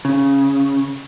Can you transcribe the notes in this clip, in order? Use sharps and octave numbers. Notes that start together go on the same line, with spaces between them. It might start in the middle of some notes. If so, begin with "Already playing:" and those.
C#3